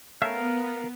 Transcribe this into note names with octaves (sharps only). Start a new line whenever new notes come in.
A3 B3 C#4 A#4 E5 F5